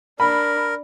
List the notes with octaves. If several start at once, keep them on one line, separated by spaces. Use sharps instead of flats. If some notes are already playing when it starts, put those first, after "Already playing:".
D4 A#4 B5